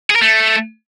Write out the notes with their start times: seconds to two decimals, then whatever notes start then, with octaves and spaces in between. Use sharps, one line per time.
0.10 G#4
0.16 A#4
0.21 A3